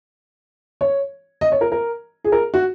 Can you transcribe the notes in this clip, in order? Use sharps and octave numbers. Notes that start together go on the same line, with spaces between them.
C#5
D#5
C#5
A#4
A#4
G#4
A#4
F#4